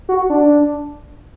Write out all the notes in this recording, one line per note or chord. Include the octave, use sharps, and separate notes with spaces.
F#4
D4